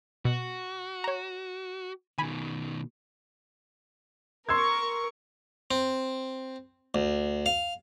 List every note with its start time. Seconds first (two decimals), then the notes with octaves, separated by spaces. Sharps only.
0.25 B2 F#4
1.04 C#5 A#5
2.18 B2 D#3 G#5 B5
4.49 A#4 C6 C#6 E6 G#6
5.71 C4
6.95 D2
7.46 F5